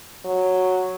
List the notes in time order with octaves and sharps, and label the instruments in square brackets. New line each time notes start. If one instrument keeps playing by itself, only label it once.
[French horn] F#3